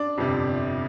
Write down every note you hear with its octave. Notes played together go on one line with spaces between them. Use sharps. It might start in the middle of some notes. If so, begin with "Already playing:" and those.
Already playing: D4 D5
G1 F2 C3